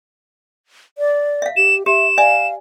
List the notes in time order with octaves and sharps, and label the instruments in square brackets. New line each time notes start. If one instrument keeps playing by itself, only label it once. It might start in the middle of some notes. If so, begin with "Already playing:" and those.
[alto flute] D5
[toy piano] E5 F5
[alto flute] G4 [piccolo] E7
[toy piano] G4 [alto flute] E5 [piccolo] E7
[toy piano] D5 E5 G#5 [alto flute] F5